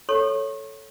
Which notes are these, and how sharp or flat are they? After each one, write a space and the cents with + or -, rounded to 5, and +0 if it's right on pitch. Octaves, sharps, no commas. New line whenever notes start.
A4 +0 C#5 +0 C#6 -35